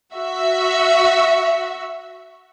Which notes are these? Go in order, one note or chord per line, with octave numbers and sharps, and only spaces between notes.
F#4 E5